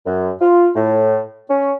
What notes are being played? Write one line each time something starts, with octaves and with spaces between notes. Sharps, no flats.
F#2
F4
A2
C#4